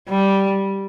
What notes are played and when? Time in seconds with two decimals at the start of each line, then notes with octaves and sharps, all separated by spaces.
0.09 G3